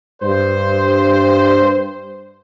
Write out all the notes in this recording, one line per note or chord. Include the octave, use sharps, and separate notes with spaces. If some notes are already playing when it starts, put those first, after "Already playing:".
G2 C5